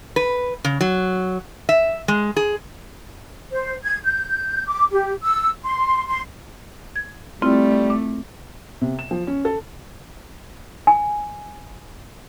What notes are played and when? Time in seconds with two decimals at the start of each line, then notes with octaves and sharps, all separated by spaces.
0.16 B4
0.64 C#3
0.81 F#3
1.69 E5
2.08 G#3
2.36 G#4
3.50 C5
3.84 G#6
4.04 G6
4.66 D6
4.91 G4
5.21 E6
5.63 C6
6.07 C6
6.96 G#6
7.42 G3 A3 C4 E4 F4
7.90 D6
8.81 C3
8.99 E7
9.11 F3
9.27 C#4
9.45 A4
10.87 G#5